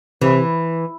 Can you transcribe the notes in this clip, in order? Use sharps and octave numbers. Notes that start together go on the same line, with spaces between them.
C3 E3